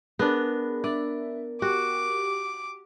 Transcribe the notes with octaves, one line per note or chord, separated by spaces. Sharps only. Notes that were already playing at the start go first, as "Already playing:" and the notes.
B3 D4 G#4 A#4
D4 D5 E5
F#4 G4 D6